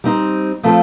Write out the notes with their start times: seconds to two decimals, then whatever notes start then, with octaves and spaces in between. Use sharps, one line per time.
0.04 G3 C4 D#4
0.63 F3 A3 C4 F4 A4